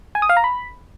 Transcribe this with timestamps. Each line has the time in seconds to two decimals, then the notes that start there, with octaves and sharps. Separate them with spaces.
0.15 G#5
0.22 D#6
0.29 F5
0.37 A#5
0.44 B5